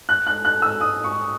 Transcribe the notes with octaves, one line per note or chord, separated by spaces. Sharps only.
F#6
F#6
F#6
E6
D#6
C#6